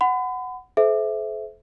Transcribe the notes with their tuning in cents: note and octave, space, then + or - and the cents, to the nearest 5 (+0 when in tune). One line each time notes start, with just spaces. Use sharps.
F#5 +0 B5 +35
A4 -40 C5 -15 E5 +0